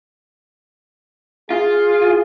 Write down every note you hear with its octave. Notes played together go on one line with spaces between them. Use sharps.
F4 G#4